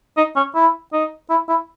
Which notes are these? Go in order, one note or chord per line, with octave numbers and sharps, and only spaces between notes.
D#4
C#4
E4
D#4
E4
E4